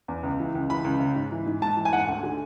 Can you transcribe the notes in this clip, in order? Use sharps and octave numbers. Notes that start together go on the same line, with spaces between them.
E2
C#2
E3
C#2
E3 B5
C#2
C#3
G#2
E3
G#2
G#2 A5
E3
G#5
G#2 F#5
G#5
D2
D3